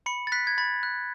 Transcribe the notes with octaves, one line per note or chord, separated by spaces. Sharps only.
B5 C#7
A6
F#6 B6
G#6
B5 A6
F#6